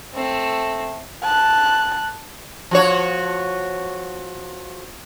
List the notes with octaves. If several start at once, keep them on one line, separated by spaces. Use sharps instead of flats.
A3 C4
A5 F#6
F3 F#4 C#5